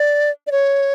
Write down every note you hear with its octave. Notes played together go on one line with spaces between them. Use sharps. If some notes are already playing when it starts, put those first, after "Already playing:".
Already playing: D5
D5
C#5